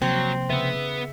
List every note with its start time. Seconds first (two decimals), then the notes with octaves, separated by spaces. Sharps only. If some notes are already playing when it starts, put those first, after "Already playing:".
0.02 C3 F3 F#3 A#3 C4
0.50 C#3 B3 B4 E5